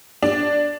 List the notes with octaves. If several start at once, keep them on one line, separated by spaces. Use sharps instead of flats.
D4